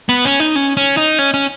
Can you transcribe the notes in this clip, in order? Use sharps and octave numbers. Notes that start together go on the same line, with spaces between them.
B3
C#4
D#4
C#4
C#4
D#4
C#4
C#4